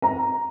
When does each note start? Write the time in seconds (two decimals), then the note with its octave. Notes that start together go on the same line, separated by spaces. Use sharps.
0.02 A#5